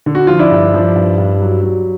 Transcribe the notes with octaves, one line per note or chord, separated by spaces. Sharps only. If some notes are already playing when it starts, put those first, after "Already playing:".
D3
F#4
F3 F4
D4 E4
G2
F3
G2
G2
F#3
F#3